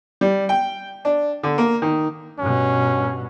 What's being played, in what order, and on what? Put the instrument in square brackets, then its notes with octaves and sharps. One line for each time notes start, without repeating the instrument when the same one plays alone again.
[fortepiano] G3
G5
D4
D3
A#3
D#3
[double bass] G2 B2 [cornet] C#4